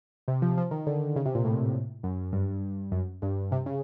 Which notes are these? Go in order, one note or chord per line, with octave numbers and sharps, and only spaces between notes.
C3
F3
F3
D#3
D3
C#3
C3
A#2
A2
F#2
G2
F#2
G2
C3
C#3